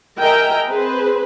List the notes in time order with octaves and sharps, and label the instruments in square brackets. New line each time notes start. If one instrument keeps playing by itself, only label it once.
[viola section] A#4 D#5 E5 G5 G#5 A#5
C4 G#4 B4 C5